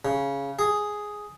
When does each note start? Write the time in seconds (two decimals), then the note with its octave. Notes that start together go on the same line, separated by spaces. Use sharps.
0.05 C#3
0.59 G#4